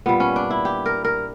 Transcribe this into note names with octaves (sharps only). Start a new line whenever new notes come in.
A#2 G3 B3
C#4
D4
E4
G4
A#4
A#4